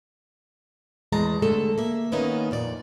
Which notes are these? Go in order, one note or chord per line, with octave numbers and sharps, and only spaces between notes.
E2 G#3 A3 A5 A#5
D3 G#3 A3 A4
A#3 E5
D#3 A#3 B3 C#4 D#4
F2 A#2 D5